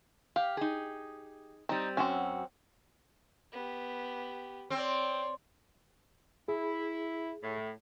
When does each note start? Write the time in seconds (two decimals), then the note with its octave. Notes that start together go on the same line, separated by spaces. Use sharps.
0.36 G4 F5
0.57 D#4 G#4
1.69 G3 C4 D#4
1.97 F#2 C4 C#4 F#4
3.52 B3 G4
4.70 C4 C#5 D5
6.48 E4 G#4
7.42 A2